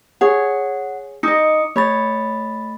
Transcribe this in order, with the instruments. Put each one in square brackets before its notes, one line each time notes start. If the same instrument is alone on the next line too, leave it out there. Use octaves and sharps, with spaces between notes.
[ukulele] G#4 C#5 [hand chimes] F#5
[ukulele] D#4 D#5 [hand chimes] D6 D#6 C#7
[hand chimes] A3 B5 A6 [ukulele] C#5